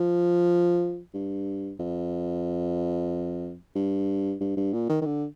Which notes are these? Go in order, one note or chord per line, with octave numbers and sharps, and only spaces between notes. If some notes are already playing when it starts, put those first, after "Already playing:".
Already playing: F3
G2
F2
G2
G2
G2
A#2
D#3
D#3
D3